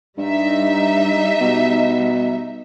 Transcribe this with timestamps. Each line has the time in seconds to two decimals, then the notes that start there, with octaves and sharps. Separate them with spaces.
0.18 G2 G3 D#4 E5
1.41 B2